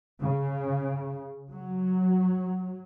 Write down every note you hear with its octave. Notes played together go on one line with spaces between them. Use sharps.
C#3
F#3